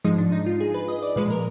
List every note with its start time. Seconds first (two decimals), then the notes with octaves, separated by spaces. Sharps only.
0.04 G#2 F3 G#3 D#4
0.18 D4
0.32 D#4
0.46 F4
0.60 G#4
0.74 B4
0.88 D#5
1.03 D5
1.16 A#2 F3 G#3 B4
1.30 A#4